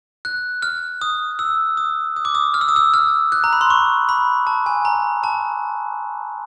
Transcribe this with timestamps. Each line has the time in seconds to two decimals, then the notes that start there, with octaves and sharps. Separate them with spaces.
0.25 F#6
0.62 F6
1.02 D#6
1.39 E6
1.77 D#6
2.16 D#6
2.25 D6
2.35 D#6
2.54 F6
2.61 E6
2.68 D#6
2.76 E6
2.94 F6
3.32 F#6
3.44 A#5
3.53 B5
3.61 C6
3.70 C#6
4.09 B5
4.47 A5
4.66 G#5
4.85 A#5
5.23 A5